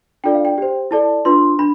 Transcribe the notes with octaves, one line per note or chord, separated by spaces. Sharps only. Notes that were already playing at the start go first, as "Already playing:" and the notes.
D4 F4 A4 D5 G5
F5
G5
G4 C5
E4 A4 D5 A5
D4 F4 B4 C6
D4 B5